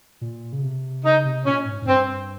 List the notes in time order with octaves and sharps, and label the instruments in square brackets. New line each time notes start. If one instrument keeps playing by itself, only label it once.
[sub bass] A#2
C#3
C3
[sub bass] C#3 [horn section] D#4
[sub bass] C3
[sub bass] A#2 [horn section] C#4
[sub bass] G#2
G#2
[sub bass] G2 [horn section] C4